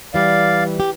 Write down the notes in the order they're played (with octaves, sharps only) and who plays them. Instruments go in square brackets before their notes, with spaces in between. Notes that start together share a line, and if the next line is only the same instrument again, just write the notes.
[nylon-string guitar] E3 G3 [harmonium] D5 F5
[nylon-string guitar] G4